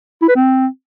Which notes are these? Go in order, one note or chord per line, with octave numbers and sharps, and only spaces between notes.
E4
B4
C4